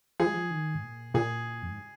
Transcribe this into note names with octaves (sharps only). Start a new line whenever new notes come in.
F3 G#4
G#3
F3
D#3
G#2
A#2
A#2 G#4
F2
G#2